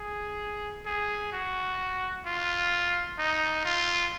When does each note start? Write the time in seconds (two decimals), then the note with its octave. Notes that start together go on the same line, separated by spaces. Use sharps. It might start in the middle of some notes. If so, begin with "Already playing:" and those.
Already playing: G#4
0.86 G#4
1.32 F#4
2.26 F4
3.19 D#4
3.65 F4